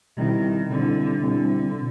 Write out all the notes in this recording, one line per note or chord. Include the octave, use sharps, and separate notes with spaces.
B2 D#3 G3 C4 E4
B2 D3 G3 C4 E4
B2 D3 G3 C4 E4
B2